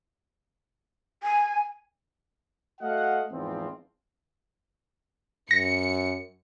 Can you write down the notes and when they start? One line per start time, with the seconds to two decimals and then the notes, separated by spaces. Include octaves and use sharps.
1.23 G#5
2.81 A3 F#4 D#5 F5 F#5
3.31 E2 G#2 F3 C4
5.51 F#2 A#6 C#7